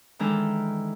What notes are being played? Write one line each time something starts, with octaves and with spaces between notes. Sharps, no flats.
D#3 E3 G#3 D4 A4 A#4